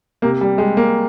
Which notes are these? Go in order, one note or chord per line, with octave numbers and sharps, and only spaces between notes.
C3 A#3
G3
G3 G#3
A#3